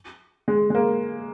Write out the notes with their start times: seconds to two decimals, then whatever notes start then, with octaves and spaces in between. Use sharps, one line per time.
0.48 G#3
0.70 G#3
0.75 A#3